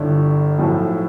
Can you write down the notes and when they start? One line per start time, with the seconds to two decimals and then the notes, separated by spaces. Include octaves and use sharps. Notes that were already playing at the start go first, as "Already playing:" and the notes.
Already playing: G1 G2 D3 E4
0.58 B1 A2 F3